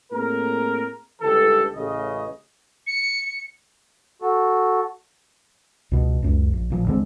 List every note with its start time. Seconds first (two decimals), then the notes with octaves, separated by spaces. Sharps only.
0.12 A2 A#3 C4 G#4 A#4
1.22 G1 C#2 D3 E3 G4 A4
1.75 A1 C#3 D#5
2.87 C#7
4.22 F#4 A4
5.91 C#2 B2
6.23 C#2 F#2
6.53 A#1
6.70 A1 A#2 F3
6.87 D#2 D3 G#3 C4